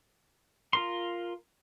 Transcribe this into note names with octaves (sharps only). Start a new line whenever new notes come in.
F4 A#4 C6